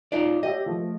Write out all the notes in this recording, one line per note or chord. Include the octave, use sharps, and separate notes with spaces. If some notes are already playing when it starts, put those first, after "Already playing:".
D#4 F4 D5
G4 C#5 D#5 E5
F3 A3